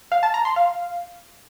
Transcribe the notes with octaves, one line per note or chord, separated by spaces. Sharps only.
F5
A5
A#5
C6
F5